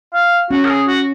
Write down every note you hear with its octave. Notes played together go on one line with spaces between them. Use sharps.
F5
C#4 F#4
A#4
G#4
F#4